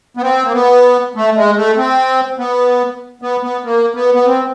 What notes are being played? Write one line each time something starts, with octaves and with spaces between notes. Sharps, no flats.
B3
C4
A#3
B3
A3
G#3
A3
C4
B3
B3
B3
A#3
B3
B3
C4